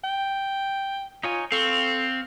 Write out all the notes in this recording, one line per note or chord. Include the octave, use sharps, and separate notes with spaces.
G5
D#4 F4 C#5 G#5
C4 A4 F5 C#6